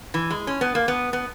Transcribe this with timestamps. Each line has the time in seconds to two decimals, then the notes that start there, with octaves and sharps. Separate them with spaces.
0.14 E3
0.30 G#3
0.47 C#4
0.61 B3
0.75 A#3
0.88 B3
1.13 B3